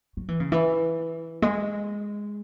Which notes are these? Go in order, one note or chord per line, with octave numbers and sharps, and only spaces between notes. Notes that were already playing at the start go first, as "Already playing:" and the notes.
F#3
E3
C#3
E3
G#3